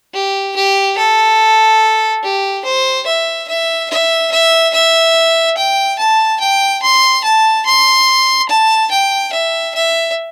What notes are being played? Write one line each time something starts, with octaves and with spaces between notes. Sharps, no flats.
G4
G4
A4
G4
C5
E5
E5
E5
E5
E5
G5
A5
G5
C6
A5
C6
A5
G5
E5
E5